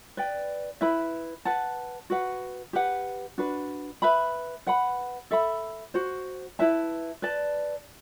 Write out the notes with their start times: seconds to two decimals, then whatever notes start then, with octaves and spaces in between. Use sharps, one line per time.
0.17 B4 D5 G5
0.81 E4 B4 E5 B5
1.45 B4 F#5 A5
2.10 F#4 B4 F#5
2.73 G4 B4 F#5
3.38 D4 F#4 B4
4.02 B4 E5 B5
4.67 B4 F#5 B5
5.31 A4 E5 B5
5.94 F#4 C5 F#5
6.59 E4 B4 E5 A5
7.22 B4 D5 A5